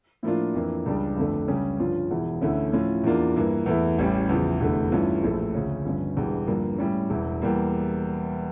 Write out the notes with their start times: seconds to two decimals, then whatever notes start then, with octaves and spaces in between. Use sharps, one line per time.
0.23 A2 F3 A#3 D4 F4
0.54 F2 E3 A#3 D4
0.86 C#2 C#3 G3 D4
1.17 G1 F2 D3 A3 D4
1.48 C#2 C#3 G3 C#4
1.80 G2 D3 F3 C#4 F4
2.11 E1 E2 E3
2.41 D2 D3 A3 C#4 E4
2.73 A2 F3 C#4 F4
3.04 E2 E3 A#3 D4 F4
3.36 G2 E3 A#3
3.66 E2 E3 A3 E4
3.98 A1 A2 G3 C#4
4.29 E2 C#3 F3
4.61 F1 E2 D3 A3
4.92 G2 E3 A3 C#4 F4
5.23 A#1 A2 F3 A3
5.55 D2 C#3 F3 C#4
5.85 G1 G2 F3 C#4
6.16 E1 E2 D3 G3
6.47 G2 D3 F3 A#3
6.78 A2 G3 C#4
7.10 E1 E2 E3
7.42 E2 E3 G3 A#3